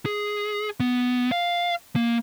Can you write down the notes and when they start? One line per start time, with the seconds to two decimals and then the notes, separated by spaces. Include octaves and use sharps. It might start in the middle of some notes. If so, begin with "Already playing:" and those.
0.06 G#4
0.80 B3
1.32 F5
1.96 A#3